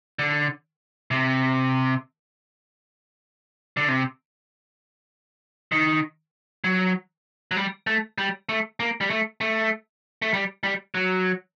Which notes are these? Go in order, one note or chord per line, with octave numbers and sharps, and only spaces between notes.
D3
C3
D3
C3
D#3
F#3
F#3
G3
A3
G3
A3
A#3
G3
A3
A3
A3
G3
G3
F#3